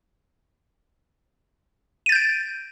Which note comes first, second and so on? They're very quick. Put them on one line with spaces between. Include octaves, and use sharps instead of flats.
D#7 A6 G6 D7